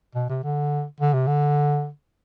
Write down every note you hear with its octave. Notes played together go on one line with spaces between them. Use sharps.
B2
C3
D3
D3
C3
D3